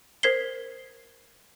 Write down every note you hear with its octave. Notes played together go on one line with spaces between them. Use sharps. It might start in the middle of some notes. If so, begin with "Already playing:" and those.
A#4 C5 G#6 B6 C7 G7